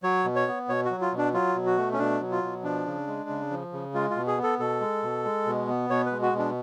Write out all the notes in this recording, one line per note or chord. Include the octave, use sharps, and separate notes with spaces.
F#3 C#5
B2
C#5
B3
B2 C#5
F#4
F#3
F4
B2
D4
F#3 F4
B2
F#4
A3
C#4
B2 D4
F#3
F4
B2
F3 D4
C#3
G#3
C#3
F3
C#3
G#3 F4
F4
B2
G#4
B3
A4
B2 A4
G#3
B2
G#3
B2
B3
B2 C#5
B4
G#3
F#4
B2
D4